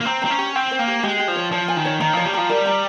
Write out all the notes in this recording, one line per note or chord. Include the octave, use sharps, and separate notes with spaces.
A#3
C4 A#5
C4 A#5
C#4
G4
C4 G5
C5
A#3
G4
G#3 G4
G4
F3
C#5
F3 C#5
G#5
D#3
C#5
D#3 A#5
F3 C#5
G3
F3 A#5
G3 A#4
A#5